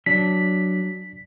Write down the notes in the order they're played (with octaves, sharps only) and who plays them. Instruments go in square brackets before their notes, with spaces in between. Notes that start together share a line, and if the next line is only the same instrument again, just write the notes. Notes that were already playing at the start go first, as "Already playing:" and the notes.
[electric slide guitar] F#3 D4 [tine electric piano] B6